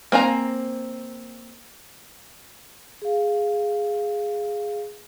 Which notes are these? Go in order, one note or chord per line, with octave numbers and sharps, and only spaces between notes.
A#3 C4 G#5 A#5
G#4 F5